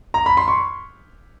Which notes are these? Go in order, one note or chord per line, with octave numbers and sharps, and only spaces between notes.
A#5
B5
C6
C#6